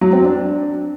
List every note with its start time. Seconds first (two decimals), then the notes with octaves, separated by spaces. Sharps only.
0.01 F#3
0.13 C4
0.24 D4